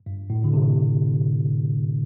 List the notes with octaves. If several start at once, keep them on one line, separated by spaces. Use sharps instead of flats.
G2
A2
D3
C3